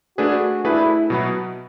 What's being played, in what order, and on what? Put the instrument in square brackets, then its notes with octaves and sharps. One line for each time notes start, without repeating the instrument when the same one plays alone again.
[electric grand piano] A3 D4 G#4 B4 [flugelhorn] F#4
[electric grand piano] A3 D4 G#4 B4 [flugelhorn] E4
[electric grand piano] B2 F#3 B3